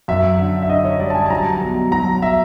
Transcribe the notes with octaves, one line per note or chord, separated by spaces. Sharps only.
F#2 E5
D3
E5
D3 D#5
C#5
G3 D5
A5
G#5
A5
F#3 A#5
B1
F#3 A#5
E5